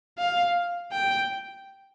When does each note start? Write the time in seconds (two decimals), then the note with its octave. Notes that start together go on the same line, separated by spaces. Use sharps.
0.18 F5
0.93 G5